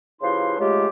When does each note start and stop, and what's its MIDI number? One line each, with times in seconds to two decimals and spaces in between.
0.22 0.57 49
0.22 0.57 53
0.22 0.57 64
0.22 0.57 67
0.22 0.57 71
0.22 0.57 84
0.60 0.88 49
0.60 0.88 54
0.60 0.88 56
0.60 0.88 57
0.60 0.88 65
0.60 0.88 67